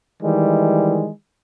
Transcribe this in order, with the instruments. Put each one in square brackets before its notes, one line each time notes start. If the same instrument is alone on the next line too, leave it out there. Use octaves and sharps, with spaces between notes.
[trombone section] D#3 E3 G3 G#3